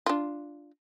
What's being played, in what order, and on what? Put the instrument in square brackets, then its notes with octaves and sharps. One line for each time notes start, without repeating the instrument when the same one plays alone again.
[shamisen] D4 F4